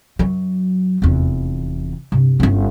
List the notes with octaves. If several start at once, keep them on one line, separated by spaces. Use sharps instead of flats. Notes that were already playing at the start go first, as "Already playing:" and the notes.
F#2 F#3
F1 E2
G2 C3
G1 C#4